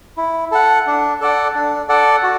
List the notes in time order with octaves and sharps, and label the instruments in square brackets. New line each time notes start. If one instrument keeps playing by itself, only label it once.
[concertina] E4
A4 F#5
D4
A4 D5 F#5
D4
A4 D5 F#5
F#4